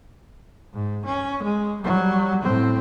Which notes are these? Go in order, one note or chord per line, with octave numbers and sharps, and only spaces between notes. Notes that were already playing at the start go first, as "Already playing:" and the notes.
G#2
C#4
G#3
F#3 G3
A2 C4